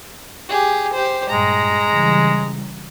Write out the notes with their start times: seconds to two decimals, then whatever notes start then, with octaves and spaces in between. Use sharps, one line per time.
0.49 G4 G#4
0.93 G4 C5
1.29 G2 A#2 G#3 A#5
1.90 C#3 E3 G3